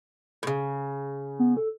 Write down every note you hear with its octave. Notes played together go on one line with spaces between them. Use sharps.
A2 C#3
B3
A4